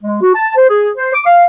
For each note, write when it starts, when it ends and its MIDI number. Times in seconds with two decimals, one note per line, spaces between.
0.03 0.21 56
0.22 0.32 66
0.34 0.54 81
0.56 0.69 72
0.69 0.91 68
0.97 1.10 72
1.14 1.24 86
1.26 1.46 77